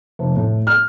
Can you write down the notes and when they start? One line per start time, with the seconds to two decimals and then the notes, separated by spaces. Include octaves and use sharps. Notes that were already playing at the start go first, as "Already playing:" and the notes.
0.19 F1
0.36 A2
0.67 F6